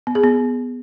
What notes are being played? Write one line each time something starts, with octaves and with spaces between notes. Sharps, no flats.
B3
G#4
B3